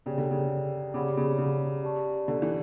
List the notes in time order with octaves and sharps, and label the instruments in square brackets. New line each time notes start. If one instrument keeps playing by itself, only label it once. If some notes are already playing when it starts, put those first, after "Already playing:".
[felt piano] C#3 [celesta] G4 D5 G5
[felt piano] D3
C#3
[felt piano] C#3 [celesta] G4 D5 F#5 B5 D6
[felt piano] C#3
C#3
[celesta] G4 D5 A5 C#6
[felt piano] D3
E3